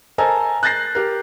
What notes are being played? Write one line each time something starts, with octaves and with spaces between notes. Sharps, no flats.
A4 A#4 C5 D#5 G#5 A#5
F#6 G6 A6 A#6 C7
G4 A#4